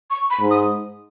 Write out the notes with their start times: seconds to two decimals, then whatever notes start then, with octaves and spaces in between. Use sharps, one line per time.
0.10 C#6
0.30 B5
0.41 G#2
0.51 D#6